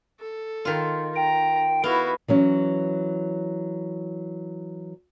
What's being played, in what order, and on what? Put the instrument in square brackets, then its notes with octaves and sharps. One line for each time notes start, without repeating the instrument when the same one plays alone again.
[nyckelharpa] A4
[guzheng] D#3 F4
[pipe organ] G5 [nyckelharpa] A#5
[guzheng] B3 F5 [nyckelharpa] E4 F#4
[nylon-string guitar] E3 F#3 C#4